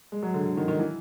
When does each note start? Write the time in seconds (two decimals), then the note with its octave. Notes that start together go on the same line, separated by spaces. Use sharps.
0.12 G#3
0.23 F#3
0.34 D3
0.46 D3
0.57 D#3
0.68 D#3
0.79 E3